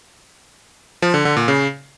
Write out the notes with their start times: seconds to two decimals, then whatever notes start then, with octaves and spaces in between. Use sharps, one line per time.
1.02 F3
1.14 D3
1.25 D3
1.37 A#2
1.48 C#3